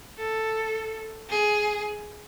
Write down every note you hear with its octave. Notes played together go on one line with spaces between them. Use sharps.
A4
G#4